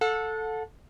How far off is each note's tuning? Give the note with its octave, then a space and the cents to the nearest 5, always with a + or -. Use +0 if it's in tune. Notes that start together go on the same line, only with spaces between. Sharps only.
A4 +0 F#5 -35